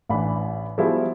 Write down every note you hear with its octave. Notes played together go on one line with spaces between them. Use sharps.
A1 E3 D4 B5
F3 G3 G#3 B3 E4 F#4